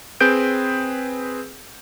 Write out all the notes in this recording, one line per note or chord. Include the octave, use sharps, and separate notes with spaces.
C4 G#4 B4 G6 D7